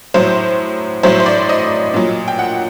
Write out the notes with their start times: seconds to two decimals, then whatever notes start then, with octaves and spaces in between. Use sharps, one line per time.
0.14 A2 F#3 C5
1.03 A2 F#3 C5
1.20 C5
1.26 D5
1.49 D#5
1.94 A#2 F#3
2.28 G5
2.39 F#5